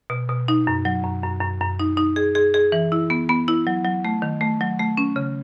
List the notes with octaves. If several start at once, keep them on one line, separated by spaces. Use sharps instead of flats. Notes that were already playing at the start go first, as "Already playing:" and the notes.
B2
B2
D#4
F#2
F#3
F#2
F#2
F#2
F#2
D#4
D#4
G#4
G#4
G#4
E3
E4
B3
B3
E4
F#3
F#3
A3
D#3
A3
F#3
A3
C#4
C#3